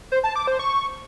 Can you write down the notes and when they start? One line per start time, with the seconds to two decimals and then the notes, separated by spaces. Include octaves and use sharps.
0.12 C5
0.24 A5
0.36 D6
0.47 C5
0.59 C#6